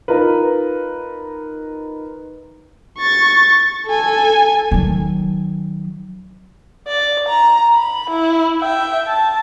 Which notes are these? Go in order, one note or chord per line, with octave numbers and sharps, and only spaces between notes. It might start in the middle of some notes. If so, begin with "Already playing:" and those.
D#4 F4 A#4 B4
C#6 A6
A4 G#5
D#3 F#3
D5
A#5
B5
E4
E5 G5
A5